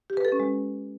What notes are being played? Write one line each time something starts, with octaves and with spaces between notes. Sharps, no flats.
G4
B4
A4
C#4
G#3